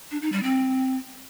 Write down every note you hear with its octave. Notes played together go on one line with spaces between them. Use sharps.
D4
D#4
G3
C4